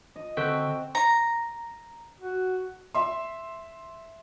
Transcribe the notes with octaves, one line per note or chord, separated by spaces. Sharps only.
D#5
D3 C4 F#4 A4 E5 G5
A#5
F#4
E5 C6